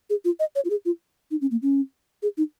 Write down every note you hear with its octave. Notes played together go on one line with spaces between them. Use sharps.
G#4
F4
D#5
C#5
F4
G#4
F4
D#4
C#4
A#3
C#4
G#4
D#4